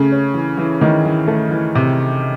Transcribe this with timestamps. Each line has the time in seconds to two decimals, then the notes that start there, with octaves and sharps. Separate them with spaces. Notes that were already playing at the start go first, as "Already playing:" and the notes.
Already playing: C#3 A3
0.12 C#4
0.34 E3
0.58 E3
0.81 D#3 E3
1.05 E3
1.28 A3
1.51 E3
1.75 C3